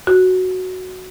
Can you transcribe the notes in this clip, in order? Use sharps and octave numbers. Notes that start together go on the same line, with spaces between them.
F#4